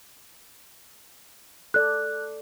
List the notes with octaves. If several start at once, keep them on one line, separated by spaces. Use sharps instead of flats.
A4 D5 F#6